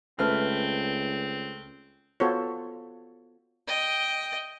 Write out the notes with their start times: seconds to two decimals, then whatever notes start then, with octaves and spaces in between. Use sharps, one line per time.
0.19 C#2 A3 C4 B4 F6
2.20 B3 F4 F#4 A4 C5 C#5
3.68 D#5 G5